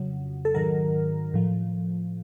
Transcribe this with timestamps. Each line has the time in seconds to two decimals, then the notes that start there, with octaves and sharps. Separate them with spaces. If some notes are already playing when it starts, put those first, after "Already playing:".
Already playing: F2 C#3 F#3
0.45 A4
0.54 G#2 D#3 F#3 A#4
1.34 A2 F3